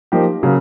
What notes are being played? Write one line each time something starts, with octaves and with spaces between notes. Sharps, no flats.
F3 A#3 D#4 G4
C#3 F#3 A#3